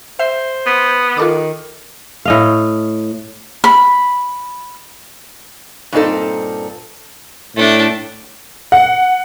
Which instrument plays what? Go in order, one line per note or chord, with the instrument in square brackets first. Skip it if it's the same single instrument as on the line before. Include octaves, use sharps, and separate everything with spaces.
[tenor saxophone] C5 [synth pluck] E5
[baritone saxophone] B3
[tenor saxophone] D#3 [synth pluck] F4 A4 D6
[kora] A2 D#5 F5
[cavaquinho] B5
[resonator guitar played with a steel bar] G2 A#2 C4 D#4 A4
[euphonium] A2 [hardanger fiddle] A3 D4
[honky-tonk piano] F#5